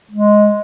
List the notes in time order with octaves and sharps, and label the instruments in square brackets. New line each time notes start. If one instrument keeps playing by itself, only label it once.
[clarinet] G#3